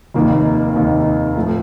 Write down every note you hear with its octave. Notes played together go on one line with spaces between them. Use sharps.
F1 D#2 D#3 A#3 D#4
F1 D#2 D#3 A#3 D#4
A2 F3 A3